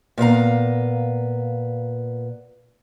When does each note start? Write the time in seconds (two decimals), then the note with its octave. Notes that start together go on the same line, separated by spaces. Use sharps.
0.18 A#2 B3 F5 A#5